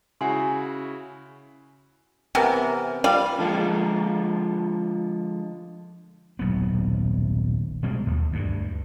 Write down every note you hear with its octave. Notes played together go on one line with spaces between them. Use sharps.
C#3 E4 F#4 F#5 G#5 C6
C3 E3 B3 A#4
G3 F4 F5
D3 F3 G#3 F4
D#1 B1 B3
B2 D3 G3 G#3
D#2
D2 G2